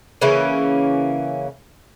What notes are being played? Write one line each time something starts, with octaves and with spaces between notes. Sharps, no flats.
C#3 E3 A#3 C#4